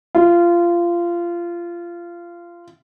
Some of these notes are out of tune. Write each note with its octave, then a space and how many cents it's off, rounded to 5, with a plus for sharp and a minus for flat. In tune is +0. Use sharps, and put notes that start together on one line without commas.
F4 -20